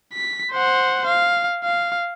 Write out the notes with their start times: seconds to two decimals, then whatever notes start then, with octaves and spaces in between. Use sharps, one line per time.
0.14 B6
0.52 C5 F#5
1.07 F5
1.63 F5